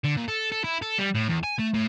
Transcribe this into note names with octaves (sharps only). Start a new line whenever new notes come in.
D3
A#2
A4
A4
E4
A4
G3
A2
E2
G#5
A3
A2